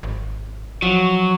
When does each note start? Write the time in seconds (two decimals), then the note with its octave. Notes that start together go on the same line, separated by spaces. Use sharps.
0.03 G#1
0.82 F3 F#3